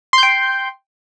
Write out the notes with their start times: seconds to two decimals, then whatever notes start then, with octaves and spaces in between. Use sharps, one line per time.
0.13 C6
0.18 G6
0.23 G5